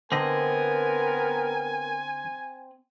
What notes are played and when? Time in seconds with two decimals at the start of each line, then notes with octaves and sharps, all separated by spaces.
0.12 D3 B3 C4 A#4 D#5 G#5